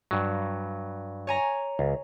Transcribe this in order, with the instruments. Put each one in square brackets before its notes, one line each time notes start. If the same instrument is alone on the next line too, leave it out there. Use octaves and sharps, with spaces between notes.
[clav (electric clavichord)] G2 F#3
[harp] C#5 G#5 A#5
[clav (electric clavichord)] C#2